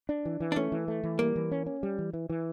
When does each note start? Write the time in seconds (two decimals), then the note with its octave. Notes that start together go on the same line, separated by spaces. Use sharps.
0.09 D4
0.25 E3
0.40 E3
0.52 D4
0.56 A3 C#4
0.72 E3
0.88 A3
1.03 E3
1.19 G3 A#3
1.36 E3
1.52 C#4
1.66 C#4
1.83 G3
1.98 E3
2.13 E3
2.30 E3